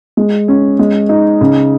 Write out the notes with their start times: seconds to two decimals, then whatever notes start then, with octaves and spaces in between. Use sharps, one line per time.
0.17 G#3
0.48 C#4
0.79 G#3
1.09 D#4
1.41 C#3